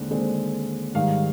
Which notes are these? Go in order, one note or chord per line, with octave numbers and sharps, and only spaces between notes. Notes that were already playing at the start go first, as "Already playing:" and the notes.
Already playing: D#2 D3 G#3 C4
D#2 D3 G#3 C4
G#2 D#3 G3 F5